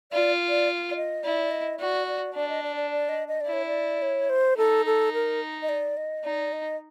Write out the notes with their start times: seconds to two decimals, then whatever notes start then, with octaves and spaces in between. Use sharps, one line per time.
0.12 F4 D5
0.49 D5
0.91 D5
0.96 D#5
1.24 E4 D5
1.51 D#5
1.79 F#4 D5
2.07 D5
2.35 D4 D5
2.49 D#5
2.63 D5
2.76 D5
2.91 D5
3.09 D#5
3.28 D#5
3.41 D5
3.47 E4
3.53 C#5
3.66 D5
4.02 C#5
4.30 C5
4.57 D#4 A4
4.86 A4
5.13 A#4
5.62 D#5
5.69 D5
5.97 D#5
6.24 D#4 D5
6.52 D#5